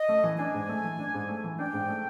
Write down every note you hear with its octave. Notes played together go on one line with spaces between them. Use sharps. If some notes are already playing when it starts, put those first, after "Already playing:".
Already playing: D#5
A3
E3
D4 G#5
G#2
A3
E3
D4
G#2
A3
E3
D4 G5
G#2
A3